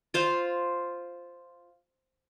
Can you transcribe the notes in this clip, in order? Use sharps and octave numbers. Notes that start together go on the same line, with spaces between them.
F4 C5 F5